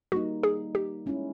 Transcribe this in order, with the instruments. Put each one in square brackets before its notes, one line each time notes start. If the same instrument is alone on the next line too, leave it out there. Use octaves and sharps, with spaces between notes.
[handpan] G3 A#3 D#4 [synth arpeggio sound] F#4
[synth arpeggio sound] G#4
G4
[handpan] G#3 C#4 E4